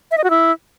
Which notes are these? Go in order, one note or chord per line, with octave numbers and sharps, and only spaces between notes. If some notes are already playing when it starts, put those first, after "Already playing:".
E5
D#5
F#4
E4